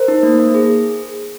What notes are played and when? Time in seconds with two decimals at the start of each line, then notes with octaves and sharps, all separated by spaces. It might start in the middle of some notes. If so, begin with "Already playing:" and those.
Already playing: A#4 C5
0.08 D#4
0.23 A#3
0.39 A#3
0.55 G#4